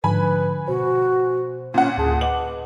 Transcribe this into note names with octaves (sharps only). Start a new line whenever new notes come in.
G#2 D3 F3 B4 G#5 B5
B2 F#4 C5
A#2 C#4 F#5
D2 A2 G#4 A5
B4 D#5 F#5 D6 F#7